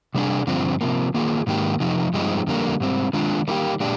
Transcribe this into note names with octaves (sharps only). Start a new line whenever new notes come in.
C3 G3 D4 G#4
G2 D3 F3 C4
C3 F3 A#3
D#3 A#3 F4 G#4
G#2 D#3 A#3 D#4 G4
F2 C3 F3 D#4
G2 F3 G#3 C4 D#4
F2 D3 G3 A#3
G#2 G3 C4
D#3 G#3 D4 F4
D#3 G3 A#3 D#4 G4
A#2 G#3 D4 G4